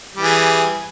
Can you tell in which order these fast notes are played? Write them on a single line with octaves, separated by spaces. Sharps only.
G3 E3 G#4